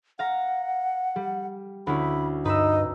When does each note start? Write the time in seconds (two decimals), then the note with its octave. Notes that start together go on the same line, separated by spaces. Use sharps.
0.19 F5 F#5 A#5
1.16 G3
1.87 D2 C#4 E4 B5
2.45 G2 D#4 B4 D#5 E6